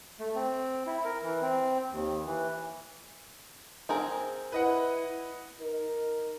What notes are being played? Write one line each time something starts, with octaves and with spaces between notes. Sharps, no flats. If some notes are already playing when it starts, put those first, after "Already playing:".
A3
C4
E4
A#4
E3
C4
D#2
E3
C4 G#4 A#4
E4 B4 D#5 F#5
D#4 A#4